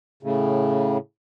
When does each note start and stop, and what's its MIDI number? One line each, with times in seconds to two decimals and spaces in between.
0.23 0.97 45
0.23 0.97 49